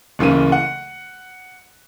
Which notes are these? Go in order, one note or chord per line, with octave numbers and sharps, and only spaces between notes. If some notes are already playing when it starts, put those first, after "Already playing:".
D1 C#3 E3 A#3 D#7
F#5